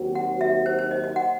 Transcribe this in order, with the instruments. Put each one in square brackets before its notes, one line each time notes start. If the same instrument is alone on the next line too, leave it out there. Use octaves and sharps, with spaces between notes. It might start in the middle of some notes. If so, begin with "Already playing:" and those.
Already playing: [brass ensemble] D#2 D#3 F#3 C4 F#4
[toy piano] F#5
E5
C5
C5
D#5
D#5
F#5